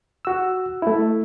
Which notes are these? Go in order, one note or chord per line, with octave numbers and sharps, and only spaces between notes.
F#4 E6
A3 E4